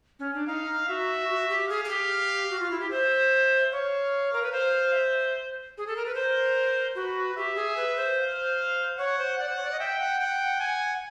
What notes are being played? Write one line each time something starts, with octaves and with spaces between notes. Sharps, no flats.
C#4
D4
D#4 F5
F#4 E5
F#4
G4
G#4 F5
G#4
G4
F#4
F4
E4
G4
C5 E5
C#5 F5
A#4
B4
C5 F5
E5
G#4
A4
A#4
B4
A#4 C5
F#4 B4
G4 E5
G#4
B4
C5
F5
C#5 F#5
C5
D5 F#5
C5
C#5
D5
D#5
E5 G5
F#5
F#5 G5
G#5